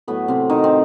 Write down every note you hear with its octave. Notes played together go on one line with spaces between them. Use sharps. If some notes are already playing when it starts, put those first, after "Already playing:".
A2 F#3 A3 B3
C3 C4
D#3 D#4
C4